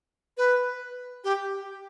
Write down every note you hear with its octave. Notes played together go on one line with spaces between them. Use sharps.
B4
G4